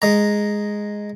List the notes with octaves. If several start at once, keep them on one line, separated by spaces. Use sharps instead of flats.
G#3 A#5